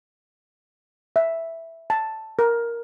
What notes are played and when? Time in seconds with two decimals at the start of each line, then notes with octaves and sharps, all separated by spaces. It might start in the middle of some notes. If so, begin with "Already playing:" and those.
1.16 E5
1.90 A5
2.39 A#4